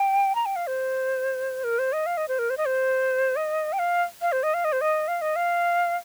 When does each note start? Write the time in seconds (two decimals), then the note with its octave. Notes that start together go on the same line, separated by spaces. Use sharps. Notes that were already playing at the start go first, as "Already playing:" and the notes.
Already playing: G5
0.35 A#5
0.46 G5
0.56 F5
0.67 C5
1.64 A#4
1.79 C5
1.93 D#5
2.06 F5
2.17 D#5
2.28 C5
2.39 A#4
2.50 C5
2.58 D#5
2.66 C5
3.36 D#5
3.73 G5
3.79 F5
4.22 F5
4.32 C5
4.43 D#5
4.54 F5
4.65 D#5
4.72 C5
4.81 D#5
5.08 F5
5.22 D#5
5.36 F5